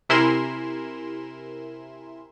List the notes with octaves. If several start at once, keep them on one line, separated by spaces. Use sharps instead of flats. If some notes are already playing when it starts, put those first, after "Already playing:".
C3 E4 A#4 G#5 C6 E7